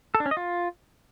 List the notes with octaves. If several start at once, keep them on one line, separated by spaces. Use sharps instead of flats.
A4
D4
C#4
D#5
F4